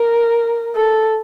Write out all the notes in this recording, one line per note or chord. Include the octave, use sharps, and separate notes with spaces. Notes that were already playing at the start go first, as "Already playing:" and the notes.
Already playing: A#4
A4